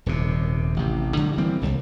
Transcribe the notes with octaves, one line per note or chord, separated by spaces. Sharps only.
D#1 D#2 C3
A1 C3
D3 F#3 G3
E3 G3 A#3 C4
D1 C2